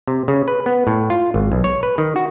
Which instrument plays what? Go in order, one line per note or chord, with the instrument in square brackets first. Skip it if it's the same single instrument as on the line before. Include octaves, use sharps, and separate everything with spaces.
[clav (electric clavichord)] C3
C#3
B4
B3
A2
F4
G#1
B1
C#5
B4
D#3
F#4